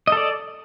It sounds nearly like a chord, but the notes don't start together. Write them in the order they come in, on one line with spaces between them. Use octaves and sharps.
D#5 A4 D5